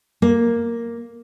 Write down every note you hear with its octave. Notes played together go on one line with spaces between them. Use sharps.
A#3